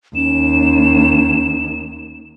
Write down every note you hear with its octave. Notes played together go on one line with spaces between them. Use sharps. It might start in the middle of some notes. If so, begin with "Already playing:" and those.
D#2 C#4 E7